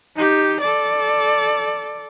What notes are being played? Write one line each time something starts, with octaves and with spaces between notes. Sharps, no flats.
D#4 G4
A4 D5